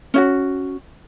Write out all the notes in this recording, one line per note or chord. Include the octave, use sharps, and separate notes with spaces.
C#4 E4 F#4